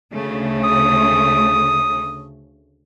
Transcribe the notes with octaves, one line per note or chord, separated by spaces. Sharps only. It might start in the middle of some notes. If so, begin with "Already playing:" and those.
D2 C#3 A3
D#6